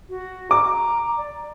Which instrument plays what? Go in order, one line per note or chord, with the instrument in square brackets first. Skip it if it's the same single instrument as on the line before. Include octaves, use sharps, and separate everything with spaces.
[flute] F#4
[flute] A#5 [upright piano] D6
[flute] D5